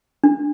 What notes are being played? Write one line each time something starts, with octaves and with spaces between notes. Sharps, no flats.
D4